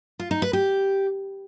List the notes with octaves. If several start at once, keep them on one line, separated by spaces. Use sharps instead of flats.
F4
D#4
B4
G4